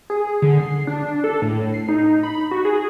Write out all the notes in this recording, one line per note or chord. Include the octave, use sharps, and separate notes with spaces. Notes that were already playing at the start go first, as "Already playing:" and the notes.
G#4
D3
C7
D4
A4
A2
C7
D#4
B5
F#4
G#4